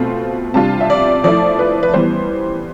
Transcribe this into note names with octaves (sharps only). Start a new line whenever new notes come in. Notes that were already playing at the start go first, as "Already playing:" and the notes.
Already playing: B2 A3 C4 F4
C3 G3 D4 F4 A5
E5
D5
F3 A3 E4 D5
B4
B4
E3 G3 B3 C5